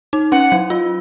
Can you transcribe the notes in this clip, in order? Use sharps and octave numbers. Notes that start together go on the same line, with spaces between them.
D#4
C#4 F#5
F#3
F4